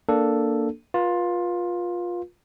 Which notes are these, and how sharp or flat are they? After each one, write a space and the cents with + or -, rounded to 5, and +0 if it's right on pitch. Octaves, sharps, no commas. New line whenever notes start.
A#3 +0 D4 +0 A4 +0
F4 +15 B4 -35